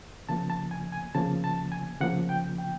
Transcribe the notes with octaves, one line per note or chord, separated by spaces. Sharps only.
C#3 F3 A#3 A5
A5
G#5
G#5
C#3 F3 A#3 A5
A5
G#5
C#3 F3 A#3 F#5
G5
G5